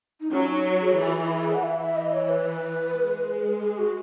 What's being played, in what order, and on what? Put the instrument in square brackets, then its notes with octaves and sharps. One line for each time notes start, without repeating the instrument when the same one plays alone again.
[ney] D#4
[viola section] F#3 [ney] C#4
[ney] D#4
G#4
F#4
[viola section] E3 [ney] G#4
[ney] F#5
[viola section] E3 [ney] E5
[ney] E5
D#5
C#5
B4
[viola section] G#3
[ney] G#4
F#4